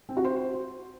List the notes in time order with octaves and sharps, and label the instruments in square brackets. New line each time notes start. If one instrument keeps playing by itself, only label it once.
[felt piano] C4
F#4
C5